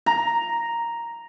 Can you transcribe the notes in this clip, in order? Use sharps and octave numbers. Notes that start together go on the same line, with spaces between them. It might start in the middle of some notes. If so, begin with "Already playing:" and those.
A#5